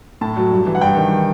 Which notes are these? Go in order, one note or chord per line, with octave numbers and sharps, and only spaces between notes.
A2 A5
F#3
G2
E3
F#5
G2 G5
D#3